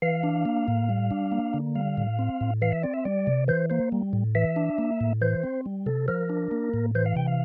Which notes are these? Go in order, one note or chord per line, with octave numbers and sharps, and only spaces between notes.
E3 F5
D4
A#3
A2
G3
D4
A#3
D3
G3 F5
A2
C4
A2
E3 F5
E5
C4 D5
E5
G3 D5
C3
E3 C5
A#3 C5
G3
A2
E3 E5
D4
A#3
A2
E3 C5
C4
G3
C3 A4
F3 A#4
D4
A#3
A2
E3 C5
F5
C3 G5
F5